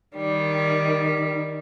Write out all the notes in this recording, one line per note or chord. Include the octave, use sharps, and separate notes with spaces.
D#3 G3